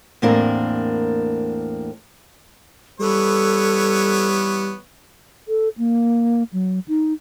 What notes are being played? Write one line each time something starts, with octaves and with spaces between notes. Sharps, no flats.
E2 A2 A#3 C4 D4 A#4
E3 G3 B3 A4 C#5
A4
A#3
F#3
D#4